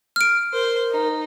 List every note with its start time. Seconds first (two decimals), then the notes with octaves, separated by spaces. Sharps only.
0.16 F6 D7
0.53 A#4 C5
0.91 D#4